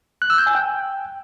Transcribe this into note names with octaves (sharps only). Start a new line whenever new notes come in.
F#6
E6
G6
G#5
G5